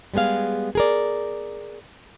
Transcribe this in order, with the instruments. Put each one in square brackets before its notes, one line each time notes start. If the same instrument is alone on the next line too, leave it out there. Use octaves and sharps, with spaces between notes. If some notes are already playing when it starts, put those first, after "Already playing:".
[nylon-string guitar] G3 G#3 B3 G#4 F5
G#4 A#4 D5